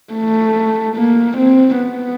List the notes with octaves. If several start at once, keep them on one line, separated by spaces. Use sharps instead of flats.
A3
A#3
C4
B3